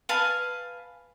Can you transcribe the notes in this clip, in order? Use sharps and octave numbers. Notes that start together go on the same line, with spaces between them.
B4 F5 G#5 A5